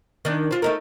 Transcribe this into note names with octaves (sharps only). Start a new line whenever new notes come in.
D#3 D4
C4 F4
A3 D#4 A#4